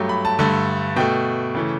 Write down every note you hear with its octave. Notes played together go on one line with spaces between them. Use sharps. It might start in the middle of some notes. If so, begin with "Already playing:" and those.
Already playing: G2 F#3 A3 G5
B5
A5
G2 D3 A3 A5
B2 A3 G5
C#3 E3 A3